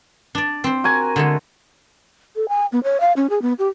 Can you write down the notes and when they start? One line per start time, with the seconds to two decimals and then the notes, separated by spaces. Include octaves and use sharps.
0.35 D4 D5
0.64 C4 C5
0.84 F#4 A#4 G#5
1.16 D3 G#3 A3
2.36 A4
2.49 G#5
2.72 B3
2.84 C#5
3.00 F5
3.16 C#4
3.30 G#4
3.42 B3
3.59 G4